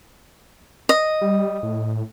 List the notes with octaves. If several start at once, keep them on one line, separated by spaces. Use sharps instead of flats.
D#5
G3
A2